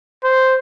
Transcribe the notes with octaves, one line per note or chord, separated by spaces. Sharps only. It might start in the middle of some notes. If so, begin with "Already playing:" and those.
C5